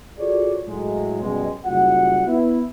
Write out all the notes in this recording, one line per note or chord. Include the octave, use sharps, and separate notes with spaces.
F4 F#4 G#4 A4 C#5 D5
A2 F#3 G#3
F#2 B2 G3 G#3
F#1 G3 F4 F#4 F#5
B3 E4